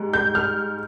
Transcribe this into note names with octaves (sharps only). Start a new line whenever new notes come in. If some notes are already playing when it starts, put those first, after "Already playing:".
Already playing: G#2 G3
G6
F6